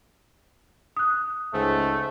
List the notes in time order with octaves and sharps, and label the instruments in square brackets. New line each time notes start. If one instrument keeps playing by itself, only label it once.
[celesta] D#6 F#6
[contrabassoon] C#2 [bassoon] G#2 [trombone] A3